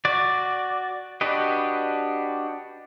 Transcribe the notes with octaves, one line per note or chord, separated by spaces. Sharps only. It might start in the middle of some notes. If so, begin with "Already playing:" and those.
F#4 D5
D4 F#4 G4 B4 D#5